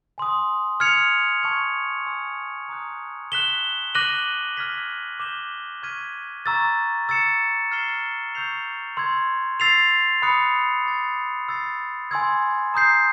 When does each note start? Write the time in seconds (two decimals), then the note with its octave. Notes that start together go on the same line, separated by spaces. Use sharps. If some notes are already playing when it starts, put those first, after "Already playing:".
0.18 G#5 C6 D#6
0.80 F6 G#6 C#7 F7
1.43 A5 C#6 F6 G#6
2.06 G#5 C6 E6
2.69 A#5 D#6 F#6
3.32 F#6 B6 E7 G7
3.95 D6 F#6 A#6 D#7 F#7
4.57 D6 F6 G#6 B6
5.20 D6 G6 B6 E7 G7
5.83 C#6 F6 G#6 B6 D#7
6.46 A#5 C#6 E6 A6
7.09 E6 A6 C#7 E7
7.71 F6 A6 C7 E7 G7
8.35 C#6 E6 G6 C7 F7
8.97 C6 E6 G#6
9.60 E6 A6 C7 F7
10.22 B5 D#6 F#6 A6 C#7
10.85 D6 F#6 A6
11.49 E6 A6 C7
12.11 G#5 C6 E6 G#6
12.74 A#5 D#6 G6 C7